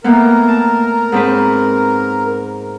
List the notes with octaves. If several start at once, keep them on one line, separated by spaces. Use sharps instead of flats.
A2 A#3 B3 A#4
A5
G#2 C4 B4